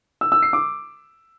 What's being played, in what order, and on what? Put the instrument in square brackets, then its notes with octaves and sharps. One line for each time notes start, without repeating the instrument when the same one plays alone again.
[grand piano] E6
E6
C7
D6